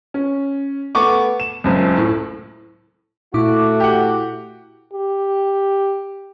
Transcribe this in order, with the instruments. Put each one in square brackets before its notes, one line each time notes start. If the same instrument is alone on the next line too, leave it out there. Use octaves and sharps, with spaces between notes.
[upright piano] C#4
A3 B3 C#6 D6
E7
F#1 C#2 F#2
A2
[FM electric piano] A#2 E4 D6 [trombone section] A3 F#4
[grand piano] G4 F#5
[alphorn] G4